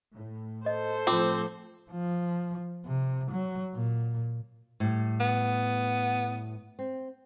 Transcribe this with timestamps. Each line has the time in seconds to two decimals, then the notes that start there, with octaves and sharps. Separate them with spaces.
0.13 A2
0.66 A4 C5 D#5
1.07 A2 F3 A3 C4 F4 D6
1.91 F3
2.86 C3
3.31 F#3
3.75 A#2
4.80 A2 G3
5.20 B3
6.79 C4